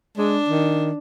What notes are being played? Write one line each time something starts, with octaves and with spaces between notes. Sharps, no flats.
G#3 D4
D#3